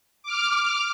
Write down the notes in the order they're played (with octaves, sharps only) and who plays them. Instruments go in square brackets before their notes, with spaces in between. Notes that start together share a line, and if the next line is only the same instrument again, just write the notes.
[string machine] D6 F6